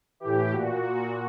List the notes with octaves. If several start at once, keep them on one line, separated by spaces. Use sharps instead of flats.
A2 E3 G4
A#2 F#4